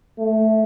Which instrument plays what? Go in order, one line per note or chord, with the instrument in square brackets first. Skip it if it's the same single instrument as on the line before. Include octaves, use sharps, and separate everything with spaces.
[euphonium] A3